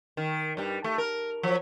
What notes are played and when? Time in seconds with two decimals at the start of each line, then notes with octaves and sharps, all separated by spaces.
0.17 D#3
0.57 G2 G3
0.84 A3
0.98 A#4
1.43 F3 F#3